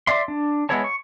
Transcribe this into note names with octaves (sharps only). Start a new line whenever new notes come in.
D5 E5 C6
D4
G#3 B3 E4 C#5 A5
C#6